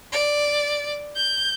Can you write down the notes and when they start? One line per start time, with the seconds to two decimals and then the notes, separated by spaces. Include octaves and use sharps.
0.12 D5
1.16 G6